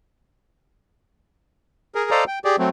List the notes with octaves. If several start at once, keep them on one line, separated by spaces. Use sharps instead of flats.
G#4 A#4
A4 C5 D5 D#5 F5 A#5
G5
G4 G#4 D5
F#3 A3 C4